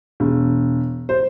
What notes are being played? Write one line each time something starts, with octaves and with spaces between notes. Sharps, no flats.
E1
C5